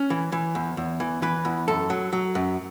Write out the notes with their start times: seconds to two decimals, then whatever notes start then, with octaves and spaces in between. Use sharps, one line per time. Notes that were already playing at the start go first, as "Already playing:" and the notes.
Already playing: C#4
0.10 E3
0.32 E3
0.55 E2
0.77 E2
1.00 E3
1.22 E3 B4
1.45 E2
1.68 F#2 A4
1.90 F#3
2.13 F#3
2.35 F#2